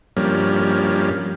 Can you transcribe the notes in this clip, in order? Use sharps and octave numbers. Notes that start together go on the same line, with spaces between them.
G2 F3 G3 A#3 C#4